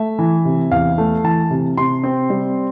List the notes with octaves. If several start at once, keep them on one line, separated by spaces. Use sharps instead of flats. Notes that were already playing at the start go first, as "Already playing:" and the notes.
Already playing: A3 E5
E3
C3
E2 F5
A3
E3 A5
C3
C3 C6
C4
G3